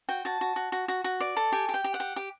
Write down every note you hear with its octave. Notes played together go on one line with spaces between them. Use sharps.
F#4 G5
F#4 A5
F#4
F#4
F#4
F#4
F#4
D5
A4
G4 G#5
G4
G5
G4
F#5
G4
G4